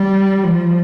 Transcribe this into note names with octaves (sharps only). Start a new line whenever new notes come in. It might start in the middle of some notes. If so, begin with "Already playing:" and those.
Already playing: G3
F3